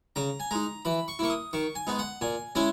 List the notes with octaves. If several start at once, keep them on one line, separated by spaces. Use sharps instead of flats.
C#3 A#5
G#5
G#3 D#4 A#5
E3 B5
C#6
A#3 E4 C#6
D#6
D#3 C#6
G#5
G#3 B3 D#4
F#5
A#2 G#5
G#3 C#4 E4 G#5